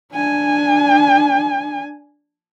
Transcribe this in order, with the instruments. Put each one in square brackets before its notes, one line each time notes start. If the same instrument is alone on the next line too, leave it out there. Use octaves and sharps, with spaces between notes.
[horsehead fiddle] D4 G#5